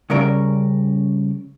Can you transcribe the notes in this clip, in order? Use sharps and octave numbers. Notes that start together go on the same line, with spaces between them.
C#3 G3 C#4 A#4 D5